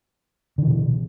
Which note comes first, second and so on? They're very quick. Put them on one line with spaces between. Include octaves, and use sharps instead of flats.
D3 E3 B2